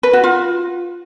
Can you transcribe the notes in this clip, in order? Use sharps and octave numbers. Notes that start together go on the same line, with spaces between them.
B4
F#4
F4